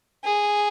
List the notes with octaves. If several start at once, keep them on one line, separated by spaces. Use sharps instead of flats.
G#4